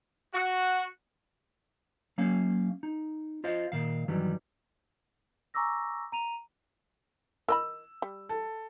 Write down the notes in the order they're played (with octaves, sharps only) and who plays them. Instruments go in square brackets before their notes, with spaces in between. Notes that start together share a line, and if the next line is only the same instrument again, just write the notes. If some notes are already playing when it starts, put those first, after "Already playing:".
[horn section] F#4
[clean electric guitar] F#3 A#3 C#4 F5
D#4
F4 C5 D#5 F5
A#2 D#3 F5
G2 D#3 E3 F#3 G3
[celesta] G#5 A#5 C#6 D6 E6 A#6
A#5 D#7 F7
[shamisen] A#4 D#5 B5 [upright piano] E6
[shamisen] G3
[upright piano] A4